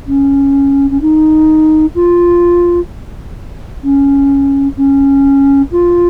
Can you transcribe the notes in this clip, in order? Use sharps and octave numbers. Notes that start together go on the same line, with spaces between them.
C#4
C#4
D#4
F4
C#4
C#4
F4